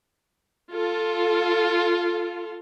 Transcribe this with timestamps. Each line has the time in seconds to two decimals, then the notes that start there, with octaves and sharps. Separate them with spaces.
0.72 F4 A4